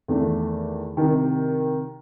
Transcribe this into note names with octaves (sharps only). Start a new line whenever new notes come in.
E2 D#3 A3
C2 C3 D#3